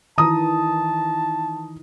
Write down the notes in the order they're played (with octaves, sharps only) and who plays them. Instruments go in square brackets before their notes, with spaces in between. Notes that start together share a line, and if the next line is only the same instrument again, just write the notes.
[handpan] D#3 E3 [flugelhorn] A5 [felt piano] A#5 D#6